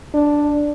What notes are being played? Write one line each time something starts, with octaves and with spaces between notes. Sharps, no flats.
D4